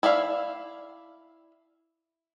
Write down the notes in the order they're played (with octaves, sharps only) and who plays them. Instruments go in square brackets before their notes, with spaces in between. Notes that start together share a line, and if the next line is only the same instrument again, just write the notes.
[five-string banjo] E4 D5 E5 F5